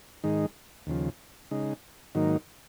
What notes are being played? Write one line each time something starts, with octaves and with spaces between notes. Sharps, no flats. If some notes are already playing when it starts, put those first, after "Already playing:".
G#2 D#3 G#3 D#4
D#2 C#3 F3
C#3 G#3 D#4
G#2 D#3 F#3 A#3 D#4